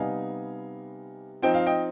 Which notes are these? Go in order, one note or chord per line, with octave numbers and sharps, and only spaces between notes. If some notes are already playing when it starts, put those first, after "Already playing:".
Already playing: C3 G3 B3 D#4 F5 G#5
F3 C4 D#4 G5
F5
D#5 G5